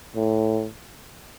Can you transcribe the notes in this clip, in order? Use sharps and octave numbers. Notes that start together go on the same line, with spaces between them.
A2